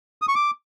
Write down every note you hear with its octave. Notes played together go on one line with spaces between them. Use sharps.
D#6
C#6
D6